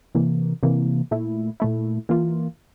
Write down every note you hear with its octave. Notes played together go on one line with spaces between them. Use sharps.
C3 E3 A#3
C3 E3 A#3
A#2 A3 E4
A#2 A3 E4
E3 A#3 F4